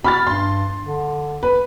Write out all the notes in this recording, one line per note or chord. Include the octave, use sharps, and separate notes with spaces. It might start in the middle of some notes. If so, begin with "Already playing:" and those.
F#4 B5 F6 A6
G2 C6
D3
B4